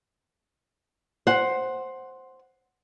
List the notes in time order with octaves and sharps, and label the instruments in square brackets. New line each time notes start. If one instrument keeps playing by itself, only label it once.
[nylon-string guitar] C5 F#5